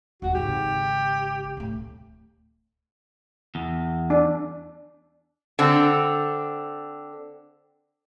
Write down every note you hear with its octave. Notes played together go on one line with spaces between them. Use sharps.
E1 E2 F#4
G#1 C#3 G4
D1 A2
E2
D4
D3 C4